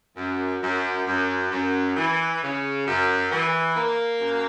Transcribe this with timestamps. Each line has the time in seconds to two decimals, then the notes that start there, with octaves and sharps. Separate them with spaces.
0.17 F#2
0.61 F#2
1.07 F#2
1.51 F#2
1.96 E3
2.42 C#3
2.87 F#2
3.32 E3
3.77 A#3
4.21 F#2